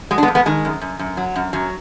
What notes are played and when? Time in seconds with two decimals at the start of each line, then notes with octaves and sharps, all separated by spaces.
0.11 F#3 G#3
0.18 D4
0.23 G#3 B3
0.28 F2
0.35 G#3 B3
0.46 D#3 G#3
0.65 F#2
0.81 F#2
0.99 F#2
1.17 F#3
1.36 F#2
1.53 F#2 F#3